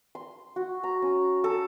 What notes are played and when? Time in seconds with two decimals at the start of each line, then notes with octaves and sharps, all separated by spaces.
0.15 C6
0.56 F#4
0.83 A#5
1.02 C#4
1.44 A4